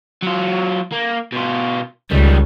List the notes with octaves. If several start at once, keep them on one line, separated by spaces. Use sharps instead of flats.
F#3 F4
A#3
B2 F4
C#2 D#3 G3